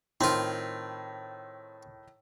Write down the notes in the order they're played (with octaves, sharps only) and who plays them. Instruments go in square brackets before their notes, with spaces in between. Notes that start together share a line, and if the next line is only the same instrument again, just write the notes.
[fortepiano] A2 D#3 [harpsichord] C4 F4